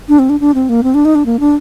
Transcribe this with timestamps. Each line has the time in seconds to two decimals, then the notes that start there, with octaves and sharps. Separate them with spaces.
0.09 D4
0.19 C4
0.29 D4
0.40 D4
0.54 C4
0.69 A#3
0.83 C4
0.94 D4
1.05 D#4
1.15 D4
1.26 A#3
1.40 D4